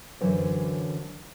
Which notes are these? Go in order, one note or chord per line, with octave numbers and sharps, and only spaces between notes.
F#2 D3 E3 F#3 C5